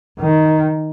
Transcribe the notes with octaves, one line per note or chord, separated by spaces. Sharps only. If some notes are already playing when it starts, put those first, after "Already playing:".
D#3